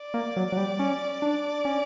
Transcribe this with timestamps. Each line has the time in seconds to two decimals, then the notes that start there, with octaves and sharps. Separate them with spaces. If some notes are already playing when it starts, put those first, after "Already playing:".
Already playing: D5
0.14 A#3
0.37 F#3
0.52 F#3
0.57 G3
0.79 C#4
1.22 D4
1.65 C#4